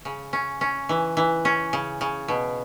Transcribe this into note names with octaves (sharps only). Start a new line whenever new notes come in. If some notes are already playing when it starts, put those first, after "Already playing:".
C#3
C#4
C#4
E3
E3
C#4
C#3
C#3
B2